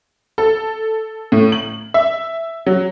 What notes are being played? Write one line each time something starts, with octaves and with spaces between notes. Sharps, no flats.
A4
A2
F#7
E5
F#3